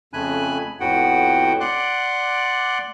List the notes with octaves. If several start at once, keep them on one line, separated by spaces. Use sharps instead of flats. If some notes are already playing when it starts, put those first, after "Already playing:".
F2 C#3 A3 G#5 B5 F#6
F2 A2 B3 F#4 F#5 G5
D5 F#5 C6 D6 F#6